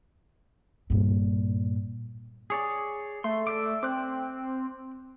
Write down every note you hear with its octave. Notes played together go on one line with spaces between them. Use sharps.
G2 A#2
G#4 C#5 D5
A3 C6
D5 E5 D6
C4 D6 F#6